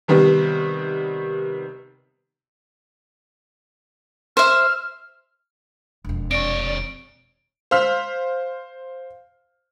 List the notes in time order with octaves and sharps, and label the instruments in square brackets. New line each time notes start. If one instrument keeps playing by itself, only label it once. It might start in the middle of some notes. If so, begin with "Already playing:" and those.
[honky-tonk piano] C3 D#3 G3 B3
[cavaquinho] C5 E5 [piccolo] F6
[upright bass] E1 F2
[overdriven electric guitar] C3 C#5 [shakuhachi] D5 [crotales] D7
[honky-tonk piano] C5 F5 F6 B6